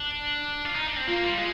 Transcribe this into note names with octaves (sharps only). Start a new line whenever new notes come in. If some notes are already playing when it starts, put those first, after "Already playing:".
Already playing: D4
F4
D#4
D4
C4
A#3 F4
G3
G#3